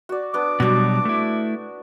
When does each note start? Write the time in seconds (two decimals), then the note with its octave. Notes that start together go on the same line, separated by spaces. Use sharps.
0.09 F#4 D5
0.34 B3 D4 D6
0.60 B2 F#3 G3 D4 F#4
1.05 A3 E4